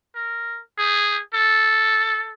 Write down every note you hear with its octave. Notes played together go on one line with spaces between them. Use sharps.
A#4
G#4
A4